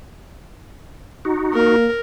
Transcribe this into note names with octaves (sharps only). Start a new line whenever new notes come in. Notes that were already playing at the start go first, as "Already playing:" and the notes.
D#4 F#4
A#3 A#4